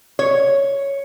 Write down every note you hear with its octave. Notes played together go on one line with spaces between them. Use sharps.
C#5